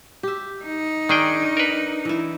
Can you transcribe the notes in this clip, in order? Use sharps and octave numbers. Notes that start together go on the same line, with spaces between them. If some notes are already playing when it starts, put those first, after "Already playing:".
G4 E5
D#4
D#3 D4 G#4 G5
A#4 B4
E3 E4